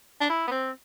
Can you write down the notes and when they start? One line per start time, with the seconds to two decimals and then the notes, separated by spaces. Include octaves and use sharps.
0.21 D4
0.29 E4
0.47 B3
0.51 C4